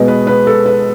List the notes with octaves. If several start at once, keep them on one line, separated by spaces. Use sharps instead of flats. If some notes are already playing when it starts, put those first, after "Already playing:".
Already playing: B2 G#3 B3 D#5
B4
B4
A4
B4